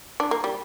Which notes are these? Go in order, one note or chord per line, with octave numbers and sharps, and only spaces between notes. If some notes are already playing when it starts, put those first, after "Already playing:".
D4
A#3
G3